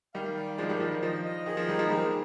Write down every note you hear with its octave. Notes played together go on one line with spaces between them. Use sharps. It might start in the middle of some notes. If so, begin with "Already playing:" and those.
D#3 G3 F5
D5
F3 G#3 D4
D#3 G3
F3 D#5
D#3
F3 D#5
D#5
D#3 G#4
F3
D#3 G3 D#4
F3 G#3
G3 A#3 G#4